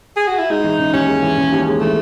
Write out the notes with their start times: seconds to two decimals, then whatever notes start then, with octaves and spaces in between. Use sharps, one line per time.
0.16 G#4
0.27 F#4
0.39 E4
0.50 G#3 D#4
0.64 E3
0.79 C#3
0.93 D#2 C#4
1.08 G#3
1.23 E3
1.37 C#3
1.52 D#2
1.67 G#3
1.81 E3 A3